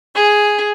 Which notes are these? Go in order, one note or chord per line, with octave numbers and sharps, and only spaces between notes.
G#4